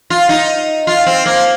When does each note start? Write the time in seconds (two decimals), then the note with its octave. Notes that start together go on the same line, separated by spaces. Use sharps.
0.10 F4
0.29 D#4
0.87 F4
1.06 C4
1.26 A#3